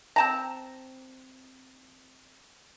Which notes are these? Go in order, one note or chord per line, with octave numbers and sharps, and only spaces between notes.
C4 A5 A#5